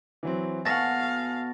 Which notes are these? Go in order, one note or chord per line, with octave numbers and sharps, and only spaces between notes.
E3 F#3 C4
B2 A4 F5 F#5 G#5 C#6 A6 A#6